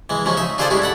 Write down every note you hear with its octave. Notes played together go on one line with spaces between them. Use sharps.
E3 G#3
C#3 F3 G#3 C#4
D#4 E5
D4 F4 G#4 A4 C5 D5
G3 G#3 C#4 E4
A4 F#5 B5